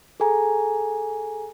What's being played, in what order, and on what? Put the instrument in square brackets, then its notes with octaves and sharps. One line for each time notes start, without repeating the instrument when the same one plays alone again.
[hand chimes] G#4 A4 G#5 A#5